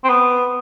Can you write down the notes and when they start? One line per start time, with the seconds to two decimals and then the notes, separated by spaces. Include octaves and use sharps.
0.04 C4
0.09 B3